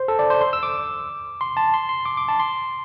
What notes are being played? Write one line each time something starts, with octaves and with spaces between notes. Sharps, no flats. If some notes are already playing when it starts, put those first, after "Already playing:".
Already playing: C5
A4
D5
C5
C6
E6
D6
C6
A5
C6
C6
D6
D6
A5
C6